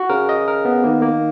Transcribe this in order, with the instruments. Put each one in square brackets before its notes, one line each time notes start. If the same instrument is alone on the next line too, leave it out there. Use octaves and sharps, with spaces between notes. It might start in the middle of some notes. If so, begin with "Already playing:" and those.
Already playing: [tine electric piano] F#4
[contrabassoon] C#3 [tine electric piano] A#4
[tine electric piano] D#5
A#4
B3
[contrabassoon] D#3 [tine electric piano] A#3
[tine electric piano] A#3